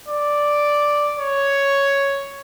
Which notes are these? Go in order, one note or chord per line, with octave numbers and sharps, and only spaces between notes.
D5
C#5